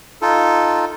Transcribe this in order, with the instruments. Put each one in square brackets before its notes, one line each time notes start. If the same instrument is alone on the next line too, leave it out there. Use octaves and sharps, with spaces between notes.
[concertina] D#4 F4 A4